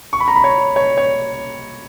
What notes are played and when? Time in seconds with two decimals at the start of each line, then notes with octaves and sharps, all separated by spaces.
0.13 C#6
0.20 B5
0.28 A#5
0.36 B5
0.44 C#5
0.76 C#5
0.98 C#5